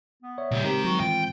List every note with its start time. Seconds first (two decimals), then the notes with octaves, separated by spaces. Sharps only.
0.23 B3
0.38 C#5 D5 E5
0.51 A#2 C#3 G3
0.64 D#3 G#3 C4 D#4 G4 A#4
0.84 F#3 F#4
1.00 A2 E3 F4 G5